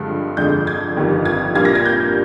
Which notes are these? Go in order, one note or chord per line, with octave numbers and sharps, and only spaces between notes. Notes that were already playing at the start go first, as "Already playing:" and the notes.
Already playing: G2 D3 F3 G#3
F1 F2 D3 G#3 D4 G6
G#6
G1 F2 D#3 G3
G#6
A#2 G3 A#3 D4 F4 G#6
A#6
G#6
G6